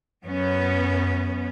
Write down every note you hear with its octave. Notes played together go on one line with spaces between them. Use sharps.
F#2 B3 C#4